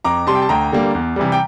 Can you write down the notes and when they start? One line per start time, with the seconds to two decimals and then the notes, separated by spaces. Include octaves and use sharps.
0.04 F2 A#5 D6
0.27 C3 G3 A5 C6
0.35 G5
0.42 A5
0.49 D2 G5 A#5
0.72 D3 G3 A#3
0.95 E2
1.16 C3 E3 G3
1.32 G5